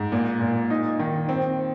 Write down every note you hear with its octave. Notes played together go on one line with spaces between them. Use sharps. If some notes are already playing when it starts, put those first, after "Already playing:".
Already playing: G#2
A#2
A#2
D#4
D#3
C4